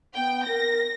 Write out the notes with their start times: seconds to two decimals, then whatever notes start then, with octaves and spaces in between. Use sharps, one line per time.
0.16 B3 G5
0.48 A#4 A#6